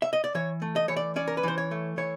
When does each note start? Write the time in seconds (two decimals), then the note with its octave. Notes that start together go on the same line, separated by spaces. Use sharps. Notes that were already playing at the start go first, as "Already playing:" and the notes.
0.02 E5
0.13 D#5
0.24 D5
0.35 E3 C#5
0.62 A3
0.76 D#5
0.88 E3 C#5
0.96 D5
1.16 C#4 D5
1.28 A#4
1.37 B4
1.43 E3 C5
1.58 C#5
1.71 A3
1.97 E3 C#5